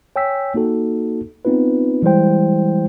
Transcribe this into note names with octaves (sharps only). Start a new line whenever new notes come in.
C#5 G5 G#5 E6 B6
A#3 D#4 F#4 A4
B3 C4 D#4 F4 B4
E3 G3 G#3 E4 C5 G5